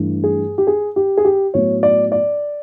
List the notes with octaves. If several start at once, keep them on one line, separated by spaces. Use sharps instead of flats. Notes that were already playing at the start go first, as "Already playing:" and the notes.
Already playing: G2 E3 A3
G#4
G4
G#4
G4
G#4
G4
A2 F#3 B3 C#5
D5
D5